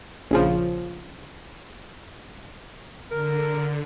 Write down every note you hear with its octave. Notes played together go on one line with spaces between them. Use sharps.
A#1 C#3 F3
D3 A#4